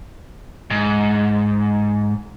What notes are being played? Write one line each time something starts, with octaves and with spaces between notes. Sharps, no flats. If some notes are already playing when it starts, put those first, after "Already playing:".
G#2